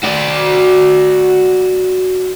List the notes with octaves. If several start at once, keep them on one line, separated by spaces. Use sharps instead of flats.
F#4 D5